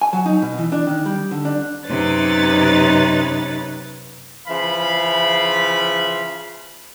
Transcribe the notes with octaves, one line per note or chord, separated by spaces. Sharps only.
G#5
F#3
D#4
B2
E3
D4
D#3
G3
D3
D4
F#2 C3 D#4 B4 C#5 A6
C#3 E3 F3 E5 F5 B5